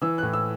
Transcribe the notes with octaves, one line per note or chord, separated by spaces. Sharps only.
E3 E6
F#6
A2
E6